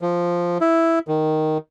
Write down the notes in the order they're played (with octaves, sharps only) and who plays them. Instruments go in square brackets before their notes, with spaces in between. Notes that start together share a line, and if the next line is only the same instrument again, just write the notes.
[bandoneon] F3
E4
D#3